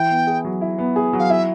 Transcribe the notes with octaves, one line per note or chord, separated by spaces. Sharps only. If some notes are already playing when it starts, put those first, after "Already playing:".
Already playing: E3 E4 G5
B3
G#4
F#3
E4
B3
G#4
F#3
F5
E4 E5